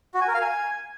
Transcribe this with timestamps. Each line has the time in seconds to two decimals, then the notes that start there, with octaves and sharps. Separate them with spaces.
0.14 F#4
0.21 G#5
0.28 A#4
0.34 F5
0.41 G#5